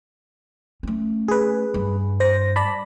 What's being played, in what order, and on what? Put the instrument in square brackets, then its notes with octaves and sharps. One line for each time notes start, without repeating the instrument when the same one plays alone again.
[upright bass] A3 C#4
[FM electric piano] G#4 B4
[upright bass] G2
[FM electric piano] C5 A#6
D5 A5 B5